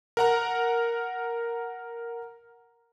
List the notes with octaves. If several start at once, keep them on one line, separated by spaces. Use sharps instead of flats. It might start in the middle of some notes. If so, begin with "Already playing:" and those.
A#4 F#5 A#5